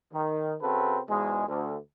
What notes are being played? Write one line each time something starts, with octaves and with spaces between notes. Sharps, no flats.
D#3
C#3 C4 C#4 F#4 A4 B4
E2 G#2 B2 G#3
D2